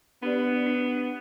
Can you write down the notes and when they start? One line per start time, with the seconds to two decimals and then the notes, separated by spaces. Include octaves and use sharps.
0.23 B3 D4 G4 D5
0.67 D4